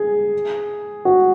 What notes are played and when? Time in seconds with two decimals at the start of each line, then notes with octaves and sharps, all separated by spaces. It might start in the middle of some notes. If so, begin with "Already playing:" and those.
Already playing: G#4
1.05 F#4